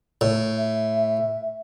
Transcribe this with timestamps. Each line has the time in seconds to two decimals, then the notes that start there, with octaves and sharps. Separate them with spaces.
0.21 A2
0.57 E5